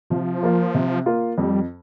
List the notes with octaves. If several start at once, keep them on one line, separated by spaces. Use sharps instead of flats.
C3 F3
A#3 F4
C3
A#3 F4
F2 G3